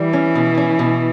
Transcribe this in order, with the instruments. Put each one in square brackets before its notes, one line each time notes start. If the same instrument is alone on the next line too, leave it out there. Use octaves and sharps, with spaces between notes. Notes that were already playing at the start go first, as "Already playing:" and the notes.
Already playing: [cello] E3 [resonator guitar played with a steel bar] G3
[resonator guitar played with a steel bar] C#4
B2
C#4
B2